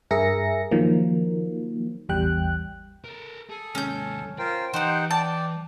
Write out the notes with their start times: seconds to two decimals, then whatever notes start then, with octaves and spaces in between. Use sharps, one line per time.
0.11 G2 G#4 A#4 E5 A#6 C#7
0.71 D#3 F3 F#3 A#3
2.09 A1 E2 G3 G5 F#6
3.04 A4 A#4
3.49 G#4 A4
3.75 D#2 G#3 C#4 G6
4.39 F4 A#4 C5 G5
4.74 E3 D#4 G4 B4 C5 F#5 G5
5.11 D5 G5 A5